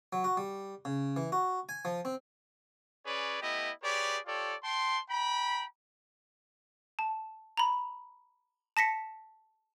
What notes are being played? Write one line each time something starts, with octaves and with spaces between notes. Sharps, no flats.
F#3
F#4
G3
C#3
E3
F#4
G#5
F3
C4
C#4 G#4 B4 C#5 D5
A3 B3 E4 G4 D#5
G4 G#4 B4 C#5 D5
F4 G4 A4 C#5 D5
G5 A5 C6
G5 A#5 B5
A5
A#5 B5
A5 A#6 B6 C#7